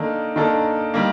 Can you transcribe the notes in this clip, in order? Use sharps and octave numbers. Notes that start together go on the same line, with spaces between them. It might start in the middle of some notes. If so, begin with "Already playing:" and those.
Already playing: D#3 A#3 D4 A4
D#3 A#3 D4 A4
D#3 G3 A#3